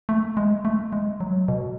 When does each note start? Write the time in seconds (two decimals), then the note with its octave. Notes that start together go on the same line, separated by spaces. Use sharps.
0.09 A3
0.37 G#3
0.65 A3
0.93 G#3
1.20 F#3
1.48 B2